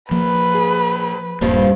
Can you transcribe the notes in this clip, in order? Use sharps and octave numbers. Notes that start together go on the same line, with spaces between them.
F3 A#3 B4
G#4
D#1 G2 F3 G3 A#3